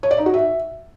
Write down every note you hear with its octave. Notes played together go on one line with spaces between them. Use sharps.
C#5
D5
D#4
F#4
E5